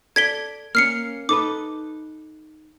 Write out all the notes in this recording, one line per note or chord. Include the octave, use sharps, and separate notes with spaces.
A4 D5 G#6 B6 G7
A#3 C#4 F6 C7 C#7
D#4 A4 B4 D6